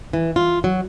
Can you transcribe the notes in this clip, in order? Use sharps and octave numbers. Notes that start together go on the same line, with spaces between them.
E3
F4
F#3